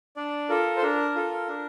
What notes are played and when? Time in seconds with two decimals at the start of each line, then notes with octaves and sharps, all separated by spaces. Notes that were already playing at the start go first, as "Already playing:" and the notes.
0.16 D4 D5
0.49 F4 A4 A#4
0.76 C5
0.82 D4 A#4
1.15 F4 A4
1.49 D4